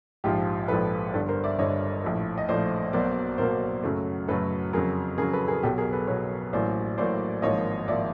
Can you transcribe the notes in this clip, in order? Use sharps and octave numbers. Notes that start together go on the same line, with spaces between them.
A#1 G#2 F3 F4 G4
A#1 G#2 F3 A4 B4
G1 G2 D3 A4 B4
A#4 C5
D5 E5
G1 G2 D3 C#5 D#5
A#1 A2 F3 A3
D#5
A#1 A2 F3 A3 C5 D5
B1 B2 F#3 A#3 C5 D5
B1 B2 F#3 A#3 A#4 C5
F#2 C#3 F#3 A3
F#2 C#3 F#3 A3 A4 B4
F2 C#3 F#3 G#4 A#4
F2 C#3 F#3 G#4 A#4
A4 B4
G#4 A#4
B1 B2 F#3 G4 A4
G#4 A#4
A4 B4
B1 B2 F#3 B4 C#5
A1 A2 F#3 A#3 C5 D5
A1 A2 F#3 A#3 C5 D5
G#1 G#2 F3 A#3 C#5 D#5
G#1 F3 A#3 D5 E5